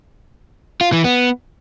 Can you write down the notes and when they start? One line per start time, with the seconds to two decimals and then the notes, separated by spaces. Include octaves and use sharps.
0.81 F4
0.93 E3
1.04 B3